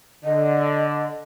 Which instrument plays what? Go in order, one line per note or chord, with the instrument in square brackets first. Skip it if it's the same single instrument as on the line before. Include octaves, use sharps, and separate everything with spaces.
[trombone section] D3 [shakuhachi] D#5